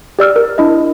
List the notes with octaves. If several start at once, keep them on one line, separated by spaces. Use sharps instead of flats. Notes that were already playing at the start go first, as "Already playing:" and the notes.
G4 D5 E6 F6
A#4
D4 E4 D#5